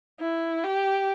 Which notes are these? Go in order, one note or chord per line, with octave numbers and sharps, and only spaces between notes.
E4
G4